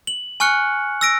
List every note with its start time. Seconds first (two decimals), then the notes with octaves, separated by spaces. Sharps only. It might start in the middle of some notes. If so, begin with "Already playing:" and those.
0.07 F#7
0.40 G#5 C#6 F6 F#6 C#7
1.01 E6 A#6 D7